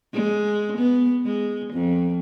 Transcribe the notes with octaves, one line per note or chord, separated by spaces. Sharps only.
G#3
B3
G#3
F2